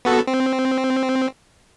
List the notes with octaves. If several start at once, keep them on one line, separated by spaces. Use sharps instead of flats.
B3 F#4 A4
C4